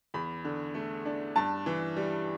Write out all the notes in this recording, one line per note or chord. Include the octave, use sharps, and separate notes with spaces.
E2 B5
D3
A3
D4
G2 A5
E3
G3